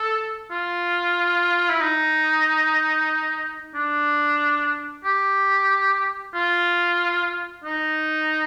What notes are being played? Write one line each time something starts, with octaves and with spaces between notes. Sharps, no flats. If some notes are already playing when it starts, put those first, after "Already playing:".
Already playing: A4
F4
E4
D#4
D4
G4
F4
D#4